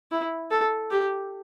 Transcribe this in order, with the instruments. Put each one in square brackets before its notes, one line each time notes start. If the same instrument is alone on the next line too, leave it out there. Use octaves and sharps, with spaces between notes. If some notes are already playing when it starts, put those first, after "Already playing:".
[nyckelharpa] E4
A4
G4